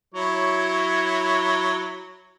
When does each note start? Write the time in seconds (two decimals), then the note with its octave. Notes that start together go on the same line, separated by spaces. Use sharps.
0.14 F#3 E4 C#5